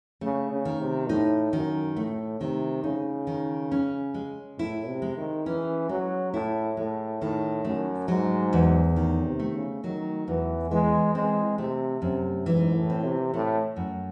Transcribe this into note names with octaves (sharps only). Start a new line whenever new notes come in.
C#3 A3
C#3
D#3
C3
A2 D#4
F#2 D#3
A2 A3
C3 D#3
C#3 D#4
D#3
C#4
G#3
A2 E4
C3
G#3
D#3
E3 C#4
F#3 G#3
A2 E4
A2 G#3
A2 D#3
F#2 A3
G#2 F#3
E2
A2 D#3
C3
A3
C#3
D#3 F#3
E2 E3
E3 G#3
G#3 C4
C3 A3
F#2 C3
G#2 E3
A2
C4
C3
A2 A3
F#2